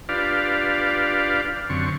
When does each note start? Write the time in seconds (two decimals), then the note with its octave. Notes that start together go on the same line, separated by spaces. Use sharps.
0.09 D4 F4 G4 B4 D5 F5
1.70 F#2 D3 C4 C#6